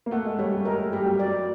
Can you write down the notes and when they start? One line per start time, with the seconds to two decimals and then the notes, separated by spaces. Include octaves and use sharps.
0.06 A#3
0.11 A3 F#5
0.26 G#3
0.39 G3 C#5
0.52 G3
0.65 G#3 A#4
0.80 A3
0.93 G3 G4
1.06 F#3
1.19 D5